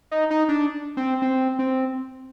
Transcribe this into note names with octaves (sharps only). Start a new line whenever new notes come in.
D#4
D#4
D4
C4
C4
C4